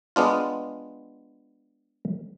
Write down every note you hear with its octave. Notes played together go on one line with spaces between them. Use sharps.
G#3 B3 D4 F4